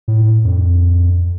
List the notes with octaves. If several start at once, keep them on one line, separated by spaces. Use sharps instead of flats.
A2
F2